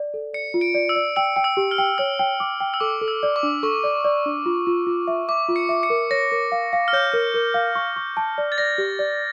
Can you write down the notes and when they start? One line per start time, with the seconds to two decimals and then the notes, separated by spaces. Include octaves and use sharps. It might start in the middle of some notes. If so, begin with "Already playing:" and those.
Already playing: D5
0.14 A4
0.33 D5 C#7
0.54 F4
0.61 D7
0.74 D5
0.89 E6
0.95 D5
1.16 G5 E6
1.36 G5
1.44 E6
1.57 G4
1.71 F6
1.78 G5
1.98 C#5 E6
2.19 G5
2.40 D6
2.60 G5
2.74 E6
2.80 A4 D6
3.01 A4
3.08 E6
3.23 D5
3.36 D6
3.43 D4
3.63 A4 C#6
3.84 D5
4.05 D5
4.26 D4
4.46 F4
4.67 F4
4.87 F4
5.07 E5
5.28 E5 D6
5.49 F4
5.56 C#7
5.69 E5
5.83 C#7
5.90 A#4
6.11 C#5 A#6
6.32 A#4
6.52 F5
6.73 F5
6.88 F6
6.93 C#5 G6
7.13 A#4
7.34 A#4
7.54 F5
7.75 C#6
7.96 C#6
8.17 A5
8.38 D5
8.52 A6
8.58 D5 A#6
8.78 G4
8.99 D5